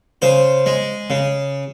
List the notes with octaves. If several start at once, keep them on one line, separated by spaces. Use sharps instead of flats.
C#3 C5
G#3
C#3